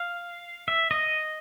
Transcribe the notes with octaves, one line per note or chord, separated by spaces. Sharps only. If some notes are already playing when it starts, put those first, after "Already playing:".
Already playing: F5
E5
D#5